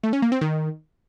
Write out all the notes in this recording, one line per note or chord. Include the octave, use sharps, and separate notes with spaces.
A3
C#4
A#3
C4
D#3